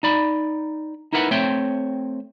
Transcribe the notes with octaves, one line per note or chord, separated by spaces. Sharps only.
D#4 D5 B5
D#4 E4 A#4 B4 F#5
A3 C4 C#5 E5 G5